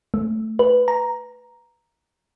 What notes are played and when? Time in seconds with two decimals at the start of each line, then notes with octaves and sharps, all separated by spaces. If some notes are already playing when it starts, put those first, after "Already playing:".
0.14 A3
0.59 B4
0.88 A#5